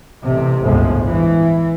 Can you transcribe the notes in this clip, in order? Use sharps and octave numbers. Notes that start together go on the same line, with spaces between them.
A1 C3
G1 C#2 A2 F3 G#3
E3